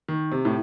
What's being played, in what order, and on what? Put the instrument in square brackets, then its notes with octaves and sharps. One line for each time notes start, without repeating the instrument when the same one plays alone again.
[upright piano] D#3
C3
A2